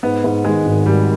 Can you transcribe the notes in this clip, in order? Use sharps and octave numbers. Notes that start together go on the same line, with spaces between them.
G#2 B3
G#2
D#3 G#3
G#1
G#1 G3